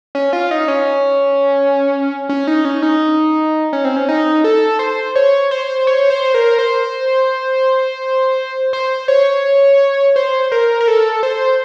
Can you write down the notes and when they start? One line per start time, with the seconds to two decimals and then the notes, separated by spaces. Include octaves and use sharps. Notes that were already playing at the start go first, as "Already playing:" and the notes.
0.15 C#4
0.33 F4
0.51 D#4
0.68 C#4
2.29 C#4
2.47 D#4
2.65 C#4
2.83 D#4
3.73 C#4
3.85 C4
3.96 C#4
4.09 D#4
4.44 A4
4.79 C5
5.15 C#5
5.51 C5
5.87 C#5
6.10 C5
6.34 A#4
6.59 C5
8.73 C5
9.08 C#5
10.16 C5
10.52 A#4
10.81 A#4
10.88 A4
11.23 C5